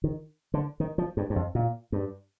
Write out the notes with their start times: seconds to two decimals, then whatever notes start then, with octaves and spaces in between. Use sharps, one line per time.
0.04 D#3
0.54 D3
0.80 D#3
0.98 F3
1.17 G2
1.30 G2
1.36 F2
1.55 A#2
1.92 G2